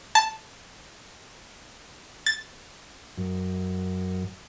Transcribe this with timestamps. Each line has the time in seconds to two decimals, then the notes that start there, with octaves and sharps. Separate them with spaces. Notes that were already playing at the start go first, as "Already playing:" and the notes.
0.15 A5
2.26 A6
3.18 F#2